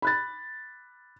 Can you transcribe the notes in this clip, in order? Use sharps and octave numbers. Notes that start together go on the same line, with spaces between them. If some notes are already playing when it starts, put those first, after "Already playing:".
B5 F#6 A6